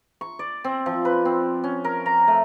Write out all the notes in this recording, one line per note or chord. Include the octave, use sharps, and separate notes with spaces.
C#6
D5
C4
F3
B4
C4
C#4
A#4
A#5
A3